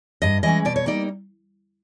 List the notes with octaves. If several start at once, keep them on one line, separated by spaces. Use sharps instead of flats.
G2 D#5
E3 G#3 C#4 D#5
B2 D5
C#5
G3 A#3 D#4 D5